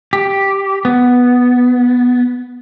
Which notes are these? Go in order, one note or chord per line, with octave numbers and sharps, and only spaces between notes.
G4
B3